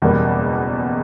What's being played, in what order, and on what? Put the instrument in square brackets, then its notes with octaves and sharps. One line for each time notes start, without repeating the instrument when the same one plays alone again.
[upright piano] F#1 E2 B2 G3 A#3